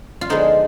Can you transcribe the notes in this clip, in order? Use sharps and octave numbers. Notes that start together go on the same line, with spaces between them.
F4
D3 F3 G#3 B3 D#4